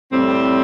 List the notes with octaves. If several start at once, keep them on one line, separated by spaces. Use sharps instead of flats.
A2 G3 C4